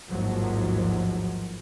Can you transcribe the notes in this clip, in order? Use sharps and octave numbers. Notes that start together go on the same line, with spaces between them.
A1 D#2 G#2 F3 F#3